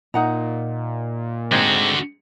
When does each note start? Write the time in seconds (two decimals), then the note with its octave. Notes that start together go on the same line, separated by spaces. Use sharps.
0.14 A#2 D#4 F#5 A#5
1.52 G#2 D3 G#3 C4 F#4